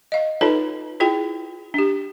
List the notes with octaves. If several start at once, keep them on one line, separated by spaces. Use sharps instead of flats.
D#5 F5
D#4 F4 A4 B4 C#5 A5
E4 F4 G#4 G5
D4 G4